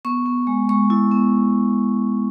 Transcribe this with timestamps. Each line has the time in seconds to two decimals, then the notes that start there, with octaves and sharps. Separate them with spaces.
0.05 B3 C#6
0.26 B3
0.47 G#3
0.69 G#3 C#6
0.90 E4
1.12 B3